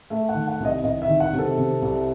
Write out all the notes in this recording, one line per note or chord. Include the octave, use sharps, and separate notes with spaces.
A3 E5
F#5
D#3
F#5
C2 D#5
C2 D#5
E5
D#3
F#5
C3
A4
C3
C2